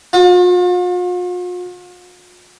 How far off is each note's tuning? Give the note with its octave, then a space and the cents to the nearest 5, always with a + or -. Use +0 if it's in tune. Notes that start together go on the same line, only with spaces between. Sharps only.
F4 +45